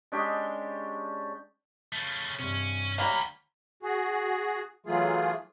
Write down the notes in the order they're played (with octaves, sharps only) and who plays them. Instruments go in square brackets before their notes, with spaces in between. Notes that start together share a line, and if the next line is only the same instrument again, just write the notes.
[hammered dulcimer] G#3 C#4 D4 G4
[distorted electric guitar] C#3 A3
[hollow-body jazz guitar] G2 C3 [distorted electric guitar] C#4
[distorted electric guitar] D2 B5 [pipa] F#3 G3 A#3
[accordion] F#4 G#4
E3 F#3 A3 F4 G#4